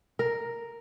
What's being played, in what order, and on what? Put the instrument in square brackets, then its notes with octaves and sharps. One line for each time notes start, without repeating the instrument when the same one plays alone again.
[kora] A#4